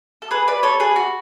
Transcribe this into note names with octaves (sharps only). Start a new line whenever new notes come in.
A4
G#4 B4
B4 D5
A4 C#5
G#4 B4
F#4